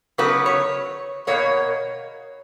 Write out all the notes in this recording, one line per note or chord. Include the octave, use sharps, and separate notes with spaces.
C#3 F#3 B3 B4
C#5
B2 A#3 C#5